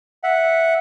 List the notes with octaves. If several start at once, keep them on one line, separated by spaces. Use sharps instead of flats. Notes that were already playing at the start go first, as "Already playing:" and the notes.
E5 F#5